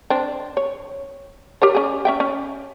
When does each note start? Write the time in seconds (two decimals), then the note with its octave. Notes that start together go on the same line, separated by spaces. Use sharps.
0.10 C4 D4
0.57 C#5
1.62 G4 A#4 C#5
1.75 C#4 G#4
2.05 C#4 E5 G5
2.20 C#4